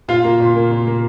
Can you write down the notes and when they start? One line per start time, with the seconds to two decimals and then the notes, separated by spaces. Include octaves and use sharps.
0.08 A#2 F4 F5
0.25 A#3
0.40 A#2
0.56 A#3
0.71 A#2
0.87 A#3